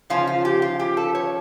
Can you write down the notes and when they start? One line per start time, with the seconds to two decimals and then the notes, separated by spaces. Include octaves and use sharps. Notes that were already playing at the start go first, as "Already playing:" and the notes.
0.10 C#3 F3 C#4 F4
0.27 F4
0.45 G4
0.62 F4
0.79 G4
0.97 A4
1.15 C#5